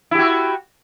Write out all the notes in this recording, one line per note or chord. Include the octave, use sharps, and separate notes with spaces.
E4 F#4 G4